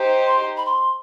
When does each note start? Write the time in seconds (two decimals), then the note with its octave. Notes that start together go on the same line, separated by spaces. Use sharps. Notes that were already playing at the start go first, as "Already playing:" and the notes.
Already playing: D#4 G4 C5
0.27 C6
0.57 B5
0.66 C6